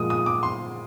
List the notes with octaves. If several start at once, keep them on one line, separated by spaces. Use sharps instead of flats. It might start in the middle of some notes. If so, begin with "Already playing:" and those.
Already playing: A#2 F3 G#3 D#6
D#6
D6
C6